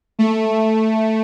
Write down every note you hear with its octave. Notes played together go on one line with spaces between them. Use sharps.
A3